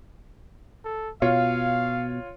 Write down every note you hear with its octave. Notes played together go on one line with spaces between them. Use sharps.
A4
B2 F4 C#5 F5